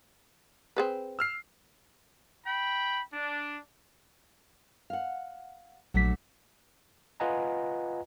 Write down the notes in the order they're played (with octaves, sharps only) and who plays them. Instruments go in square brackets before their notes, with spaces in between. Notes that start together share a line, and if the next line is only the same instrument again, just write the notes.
[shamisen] C4 G#4 B4
[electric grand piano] E6 F6 C7
[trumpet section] G5 B5
D4
[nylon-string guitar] F5 F#5
[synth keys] A#1 B6 [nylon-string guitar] F#3 A3 D4
[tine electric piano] F4 B4 D#5 F#5 G#5 A#5